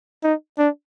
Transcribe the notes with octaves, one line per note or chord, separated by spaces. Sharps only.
D#4
D4